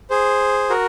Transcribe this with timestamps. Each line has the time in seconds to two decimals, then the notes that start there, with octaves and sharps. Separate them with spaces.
0.10 G#4 C5
0.70 F#4 A#4